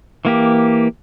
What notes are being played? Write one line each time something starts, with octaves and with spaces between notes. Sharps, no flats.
E3 A#3 G4